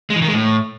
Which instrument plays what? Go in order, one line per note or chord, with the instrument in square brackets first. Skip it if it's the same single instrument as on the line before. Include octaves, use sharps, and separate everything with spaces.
[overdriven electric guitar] G#3
E3
D#3
G#3
A2